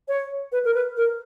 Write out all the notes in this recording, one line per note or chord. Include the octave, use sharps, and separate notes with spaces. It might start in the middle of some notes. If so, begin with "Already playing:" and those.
C#5
B4
A#4
B4
A#4